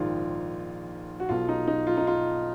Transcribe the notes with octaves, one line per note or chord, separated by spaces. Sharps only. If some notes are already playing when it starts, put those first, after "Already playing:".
Already playing: A#1 G#2 D#3 F4
F#4
B1 B2 F4
D#4
D#4
F4
D#4
F4